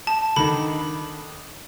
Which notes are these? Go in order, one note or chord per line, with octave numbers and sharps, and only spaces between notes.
A5
D3 D#3 D#4 B5